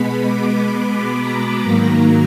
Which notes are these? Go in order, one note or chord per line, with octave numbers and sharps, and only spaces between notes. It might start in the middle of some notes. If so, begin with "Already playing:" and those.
Already playing: B2 G#3 B3 B5
D6
B5
A#5
G#2 D#3 F#3 A#3